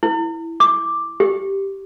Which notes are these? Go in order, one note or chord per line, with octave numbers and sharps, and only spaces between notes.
E4
D6
G4